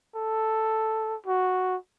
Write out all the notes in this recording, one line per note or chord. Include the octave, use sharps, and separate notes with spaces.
A4
F#4